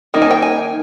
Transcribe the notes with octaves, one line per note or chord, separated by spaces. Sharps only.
D#3 A#3 D#4
G#5
G5
G#5